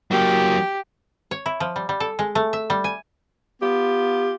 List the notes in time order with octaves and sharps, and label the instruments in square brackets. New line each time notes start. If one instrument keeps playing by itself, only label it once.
[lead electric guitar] F#3 A#3 [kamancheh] G4
[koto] C#5
E4
F3
G3
G3
A4
G#3
A3
E5
G3
G#5
[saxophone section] B3 F4 G4